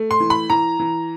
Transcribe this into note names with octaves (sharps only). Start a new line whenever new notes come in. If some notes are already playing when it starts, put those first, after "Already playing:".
Already playing: A3
C6
E3
B5
E3 A#5
E3